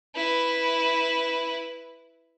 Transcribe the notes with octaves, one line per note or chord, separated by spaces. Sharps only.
E4 B4